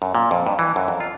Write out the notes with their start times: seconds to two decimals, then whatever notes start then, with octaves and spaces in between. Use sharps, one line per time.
0.02 F#2
0.15 A#2
0.31 F2
0.47 G2
0.59 E3
0.76 F#2
0.88 F2
1.00 F4